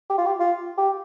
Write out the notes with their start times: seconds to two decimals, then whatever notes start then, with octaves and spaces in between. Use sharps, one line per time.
0.10 G4
0.18 F4
0.26 G4
0.40 F4
0.78 G4